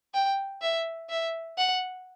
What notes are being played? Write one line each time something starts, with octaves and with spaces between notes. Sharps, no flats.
G5
E5
E5
F#5